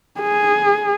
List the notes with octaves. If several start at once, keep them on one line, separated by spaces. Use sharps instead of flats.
G#4